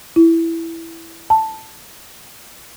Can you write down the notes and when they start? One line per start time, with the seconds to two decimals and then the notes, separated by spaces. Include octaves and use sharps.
0.16 E4
1.30 A5